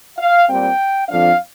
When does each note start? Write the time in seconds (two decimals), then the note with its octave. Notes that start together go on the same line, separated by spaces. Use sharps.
0.17 F5
0.48 A#2 G3 C4 G5
1.09 F2 D3 F3 D4 F5